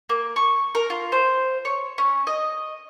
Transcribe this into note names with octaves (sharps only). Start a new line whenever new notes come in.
A#3
C#6
A#4
F4
C5
C#5
C#4
D#5